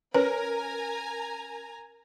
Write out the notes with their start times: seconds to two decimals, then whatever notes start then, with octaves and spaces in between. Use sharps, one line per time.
0.14 C#4 A#4 B4 G#5 A#5